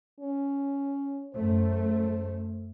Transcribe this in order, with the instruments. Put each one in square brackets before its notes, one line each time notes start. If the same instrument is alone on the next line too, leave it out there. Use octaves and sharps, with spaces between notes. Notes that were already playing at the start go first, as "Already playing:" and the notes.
[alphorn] C#4
[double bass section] F#2 A3 [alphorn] C5